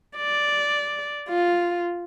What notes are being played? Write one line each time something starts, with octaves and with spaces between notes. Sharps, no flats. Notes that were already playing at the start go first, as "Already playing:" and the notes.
D5
F4